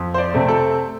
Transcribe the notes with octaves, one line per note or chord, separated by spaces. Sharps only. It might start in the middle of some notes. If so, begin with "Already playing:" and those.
Already playing: F2
C5
D5
C3 A3 C4
A4